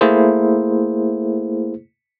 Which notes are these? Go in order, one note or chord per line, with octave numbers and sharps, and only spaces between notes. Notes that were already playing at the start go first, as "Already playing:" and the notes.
A3 A#3 E4 G#4 C5